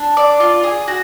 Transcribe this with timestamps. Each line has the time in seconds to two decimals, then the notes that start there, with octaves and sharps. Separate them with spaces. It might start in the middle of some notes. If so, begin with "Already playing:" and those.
Already playing: D4
0.17 D5
0.40 F4
0.63 G#4
0.88 F#4